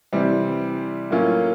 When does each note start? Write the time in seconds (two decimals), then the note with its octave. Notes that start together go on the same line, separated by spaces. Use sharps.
0.13 C3 E3 G3 C4
1.11 A2 F#3 A#3 C#4 F4